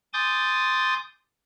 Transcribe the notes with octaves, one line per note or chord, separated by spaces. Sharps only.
G#5 C6 D6 D#6 G6 A6